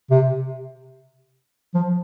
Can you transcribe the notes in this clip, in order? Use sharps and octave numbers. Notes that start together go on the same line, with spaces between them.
C3
F3